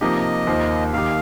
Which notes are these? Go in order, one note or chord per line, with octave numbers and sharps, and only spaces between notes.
C3 F3 A#3 D#4 G4 D#5
D#2 D#3 A#3 F4 C5
D#3 A#3 G4 F5